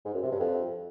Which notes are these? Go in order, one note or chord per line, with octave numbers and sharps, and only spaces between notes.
G#2
F#2
C3
G2
F2